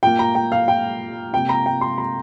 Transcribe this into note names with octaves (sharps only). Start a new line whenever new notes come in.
A#2 A#3 G5
A#5
G5
F5
G5
C3 A#3 G5
A#5
G5
C6
A#5